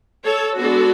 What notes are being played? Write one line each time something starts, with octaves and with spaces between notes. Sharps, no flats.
A4 C#5
G#3 B3 D4 F#4 A4